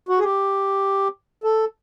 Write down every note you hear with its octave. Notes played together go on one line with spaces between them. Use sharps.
F#4
G#4
G4
A4